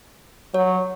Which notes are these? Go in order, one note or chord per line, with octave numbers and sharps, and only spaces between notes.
F#3 C#5